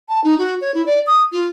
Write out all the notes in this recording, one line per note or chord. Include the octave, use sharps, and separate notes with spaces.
A5
D#4
F#4
C#5
E4
D5
D#6
F4